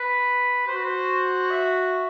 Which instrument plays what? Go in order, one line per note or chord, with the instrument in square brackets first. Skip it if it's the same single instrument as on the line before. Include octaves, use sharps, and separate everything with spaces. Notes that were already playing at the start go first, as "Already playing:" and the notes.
Already playing: [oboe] B4
[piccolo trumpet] F#4 [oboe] C5
[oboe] B4
C5
E5